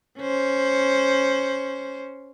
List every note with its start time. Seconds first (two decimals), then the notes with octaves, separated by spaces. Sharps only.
0.19 C#4 C5